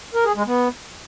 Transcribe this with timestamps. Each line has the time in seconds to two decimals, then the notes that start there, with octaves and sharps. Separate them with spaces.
0.14 A#4
0.25 G#4
0.36 G#3
0.47 B3